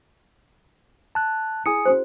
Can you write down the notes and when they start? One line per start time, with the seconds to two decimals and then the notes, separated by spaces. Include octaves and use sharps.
1.15 A5 F#6
1.66 E4 G#4 G#5 D#6 C#7
1.85 C#4 F#4 C5